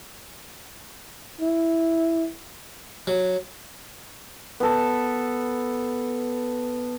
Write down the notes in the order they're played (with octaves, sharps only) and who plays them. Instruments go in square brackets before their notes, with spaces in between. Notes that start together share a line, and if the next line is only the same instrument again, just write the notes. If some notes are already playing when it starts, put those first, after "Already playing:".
[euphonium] E4
[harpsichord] F#3
[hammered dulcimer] B3 A4